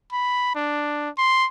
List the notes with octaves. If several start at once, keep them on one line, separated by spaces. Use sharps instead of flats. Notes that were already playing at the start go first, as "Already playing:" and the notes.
B5
D4
C6